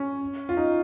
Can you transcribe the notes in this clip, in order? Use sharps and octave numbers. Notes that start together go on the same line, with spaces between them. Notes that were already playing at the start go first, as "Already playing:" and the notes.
Already playing: C#4
F4
D#4